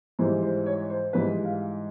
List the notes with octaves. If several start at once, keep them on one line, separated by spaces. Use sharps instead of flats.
G#2 E3 G3 C5
C5
C#5
C5
G#2 E3 G3 B4
F5